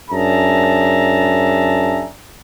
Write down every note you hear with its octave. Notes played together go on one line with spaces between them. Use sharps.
F#2 D4 G#4 E5 A5 A#5